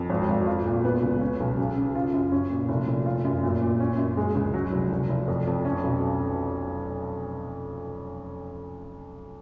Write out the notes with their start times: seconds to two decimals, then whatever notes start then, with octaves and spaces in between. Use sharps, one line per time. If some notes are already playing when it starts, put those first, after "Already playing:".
Already playing: F2
0.10 G#1
0.29 G#1
0.47 F4
0.66 A#2
0.84 B3
1.03 C#2
1.21 C#4
1.40 B1
1.57 C#3
1.76 C#3
1.95 F4
2.14 F#2
2.32 C#4
2.50 A#2
2.69 F1
2.88 F1
3.06 F4
3.25 F#2
3.43 A#2
3.61 A#2
3.80 C#4
3.98 F#2
4.17 G#3
4.35 C#2
4.54 F#3
4.73 F1
4.92 F1
5.09 F1
5.28 F2
5.47 F2
5.65 C#4
5.83 B1